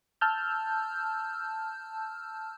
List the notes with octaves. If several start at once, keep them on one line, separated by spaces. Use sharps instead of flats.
A5 E6 F6 G6